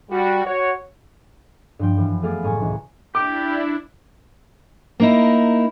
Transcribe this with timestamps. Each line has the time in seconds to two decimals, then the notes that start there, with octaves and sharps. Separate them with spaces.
0.11 G3 F#4
0.45 F#4 C#5
1.79 G2 F3 G5
1.97 F#2 E3
2.22 A3 B3 G#4 F5 D6 A6
2.43 F#1 A2 G#5 A#5 C#6
2.61 C#2 E3
3.15 D4 E4 G4 D6
5.00 A#3 D#4 E4